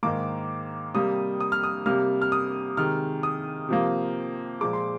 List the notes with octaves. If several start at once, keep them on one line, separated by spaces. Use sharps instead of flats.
G#2 D#3 A#3 D6
C3 G3 A#3 D#6
D#6
F6
D#6
C3 G3 A#3 F6
F6
D#6
C3 D#3 G#3 F6
D#6
C3 F3 A#3
A#2 F3 G#3 D6
C6